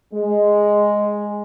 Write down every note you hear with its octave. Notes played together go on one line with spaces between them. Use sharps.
G#3